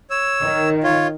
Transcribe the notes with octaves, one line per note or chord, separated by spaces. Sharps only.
C#5 E6
D#3
F4 C#5